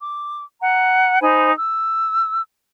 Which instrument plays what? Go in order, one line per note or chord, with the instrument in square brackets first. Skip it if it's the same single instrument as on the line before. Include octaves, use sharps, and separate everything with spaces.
[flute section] D6
F#5 A#5
D#4 C5 G#5 B5
E6